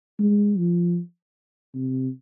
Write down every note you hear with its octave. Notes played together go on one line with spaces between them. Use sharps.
G#3
F3
C3